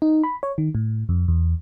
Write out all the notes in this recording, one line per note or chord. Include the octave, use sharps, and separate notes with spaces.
D#4
B5
C#5
D#3
A2
F2
E2